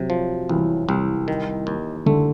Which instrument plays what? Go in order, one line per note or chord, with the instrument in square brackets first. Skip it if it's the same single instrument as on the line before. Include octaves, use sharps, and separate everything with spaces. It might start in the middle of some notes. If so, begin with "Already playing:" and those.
Already playing: [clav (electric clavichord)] C3 [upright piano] F#3
[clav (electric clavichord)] F3
[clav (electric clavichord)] C2 [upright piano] E3
[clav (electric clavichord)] C2
D#3
D#2
[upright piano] D3 [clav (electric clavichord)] A3